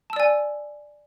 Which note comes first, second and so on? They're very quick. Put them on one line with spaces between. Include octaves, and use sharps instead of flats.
A5 E6 D5 G#5